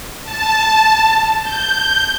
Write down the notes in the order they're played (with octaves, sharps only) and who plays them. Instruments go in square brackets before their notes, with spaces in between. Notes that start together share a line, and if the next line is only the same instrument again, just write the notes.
[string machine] A5
G6